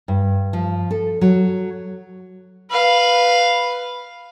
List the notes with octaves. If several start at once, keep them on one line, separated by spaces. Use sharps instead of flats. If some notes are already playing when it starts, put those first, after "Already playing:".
G2
F3
A4
F#3
B4 F5